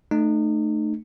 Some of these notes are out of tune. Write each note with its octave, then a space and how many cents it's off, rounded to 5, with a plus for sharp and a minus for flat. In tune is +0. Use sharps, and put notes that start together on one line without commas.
A3 +0 D#4 -35